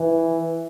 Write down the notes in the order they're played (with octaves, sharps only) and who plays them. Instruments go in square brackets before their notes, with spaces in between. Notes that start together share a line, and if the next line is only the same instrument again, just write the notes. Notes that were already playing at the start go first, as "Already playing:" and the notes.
Already playing: [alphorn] E3